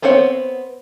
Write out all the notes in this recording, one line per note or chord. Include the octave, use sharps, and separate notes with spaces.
B3 C4 C5 C#5 F#5